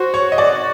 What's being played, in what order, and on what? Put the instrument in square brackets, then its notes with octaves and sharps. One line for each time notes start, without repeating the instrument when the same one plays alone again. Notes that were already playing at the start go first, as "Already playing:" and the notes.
Already playing: [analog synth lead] F#4 [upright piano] C5
[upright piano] C#5
D#5
D5